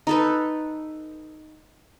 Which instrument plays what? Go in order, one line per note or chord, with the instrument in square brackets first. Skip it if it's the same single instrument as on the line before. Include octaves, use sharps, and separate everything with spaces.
[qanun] D#4 A4 B4